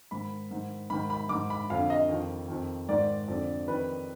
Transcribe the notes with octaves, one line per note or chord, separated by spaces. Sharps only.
G#2 D#3 B5
G#2 D#3
G#2 D#3 B5
B5
G#2 D#3 D6
B5
F2 D3 F5
D#5
F2 D#3
F2 D#3
G#2 D#3 D5
F2 D3
F2 D#3 B4